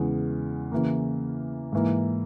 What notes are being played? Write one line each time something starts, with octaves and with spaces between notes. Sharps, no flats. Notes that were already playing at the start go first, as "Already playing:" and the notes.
Already playing: E2 C#3 G#3
C#3 E3 A#3
G#2 E3 A#3